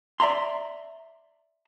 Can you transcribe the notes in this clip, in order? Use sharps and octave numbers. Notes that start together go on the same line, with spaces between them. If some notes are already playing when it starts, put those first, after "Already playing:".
D5 E5 A#5 C6